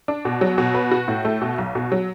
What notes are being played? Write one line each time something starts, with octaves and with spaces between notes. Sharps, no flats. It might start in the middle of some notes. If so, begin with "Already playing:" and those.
D4
B2
F#3
B2
B4
F#4
A2
A3
B2
B1
B2
F#3